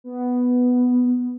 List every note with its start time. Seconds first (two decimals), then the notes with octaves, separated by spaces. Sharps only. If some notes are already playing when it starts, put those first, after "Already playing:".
0.04 B3